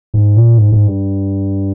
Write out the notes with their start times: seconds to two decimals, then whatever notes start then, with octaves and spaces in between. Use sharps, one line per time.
0.14 G#2
0.36 A#2
0.58 G#2
0.72 G#2
0.86 G2